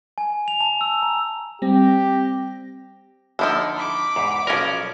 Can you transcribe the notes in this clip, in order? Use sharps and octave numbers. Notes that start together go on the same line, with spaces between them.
G#5
F7
A5
E6
A#5
G3 C4 G4 A#6
D3 F3 D#4 E4 A4
B5 D6
E2 G#2
B1 F3 C#4 A#4 D5